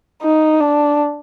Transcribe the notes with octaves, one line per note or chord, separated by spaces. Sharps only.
D#4
D4